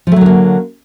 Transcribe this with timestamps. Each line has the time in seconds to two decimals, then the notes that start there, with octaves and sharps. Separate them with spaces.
0.07 F3
0.12 A3
0.16 F#3
0.21 D3
0.26 A#3